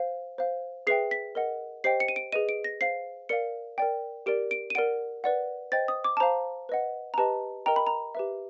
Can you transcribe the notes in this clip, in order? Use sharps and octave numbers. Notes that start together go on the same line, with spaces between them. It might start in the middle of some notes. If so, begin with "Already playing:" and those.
Already playing: C5 F5
C5 F5
G#4 B4 E5 G5 C7
B6
A#4 D#5 F#5
G4 C5 D#5 G5 C7
C#7
D#7
D7
G#4 B4 D#5 D#7
D7
A#6
C5 F5 C7
A#4 D5 F5 C#7
A#4 D5 G5
G4 A#4 D5 D7
D7
D#7
A#4 D5 F#5 D7
B4 D5 F#5
C5 D#5 G5 A6
D#6
D6
A5
C5 F5 A#5
B4 D#5 F#5
A#5
G4 B4 D#5 A5
A#4 D#5 G5 A#5
B5
A#5
G4 B4 E5